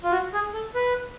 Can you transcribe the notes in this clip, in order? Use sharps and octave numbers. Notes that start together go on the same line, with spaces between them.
F4
F#4
G#4
A4
B4